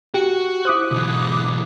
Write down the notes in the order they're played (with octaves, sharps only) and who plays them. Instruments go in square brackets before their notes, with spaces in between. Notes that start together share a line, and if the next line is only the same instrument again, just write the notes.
[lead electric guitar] F#4 [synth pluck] G4
[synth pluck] E4 C5 [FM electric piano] D6 D#6 F#6
[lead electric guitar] B1 E3 [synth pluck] D3